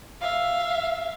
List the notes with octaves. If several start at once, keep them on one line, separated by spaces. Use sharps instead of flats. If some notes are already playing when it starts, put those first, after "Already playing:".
E5 F5